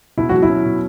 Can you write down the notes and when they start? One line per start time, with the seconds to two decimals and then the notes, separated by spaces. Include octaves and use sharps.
0.18 B2 E4
0.29 F#3 F#4
0.42 E4
0.49 C#4
0.65 B2